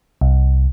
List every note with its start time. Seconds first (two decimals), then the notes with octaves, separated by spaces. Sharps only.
0.21 C2